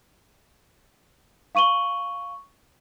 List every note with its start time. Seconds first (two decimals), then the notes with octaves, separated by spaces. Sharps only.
1.55 F5 C#6 D#7 F#7 G7